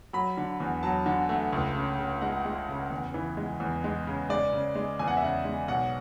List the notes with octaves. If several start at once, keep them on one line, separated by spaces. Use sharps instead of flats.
F#3 B5
D3
E2
F#3 A5
D3
A3
C#2
C#3
C#3
G#3 F#5
G#3
C#3
E2
E3
G#3
E2
G#3
C#3
G#3 D5
C#3
G#3
E2 G#5
F#5
E5
C#3 F#5
G#3
B1 F#5